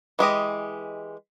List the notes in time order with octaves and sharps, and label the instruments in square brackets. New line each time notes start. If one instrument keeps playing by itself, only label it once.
[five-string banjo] E3 G#3 G4 D#5